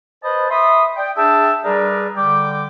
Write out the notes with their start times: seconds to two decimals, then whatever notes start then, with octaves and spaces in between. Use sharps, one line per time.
0.23 B4 C5 D#5 A5 B5
0.50 E5 B5 C6 D#6
0.95 D5 G5
1.16 D4 G#4 E5 G5 A5
1.63 G3 G#4 A#4 B4 D5
2.16 D3 G3 G5 D6